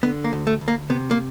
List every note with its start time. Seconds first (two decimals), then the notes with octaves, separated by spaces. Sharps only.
0.03 D3 B3
0.24 A#3
0.33 D2
0.47 A3
0.61 D2
0.68 A#3
0.90 C3 B3
1.11 A#3